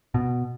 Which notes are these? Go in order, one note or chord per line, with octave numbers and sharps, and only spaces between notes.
B2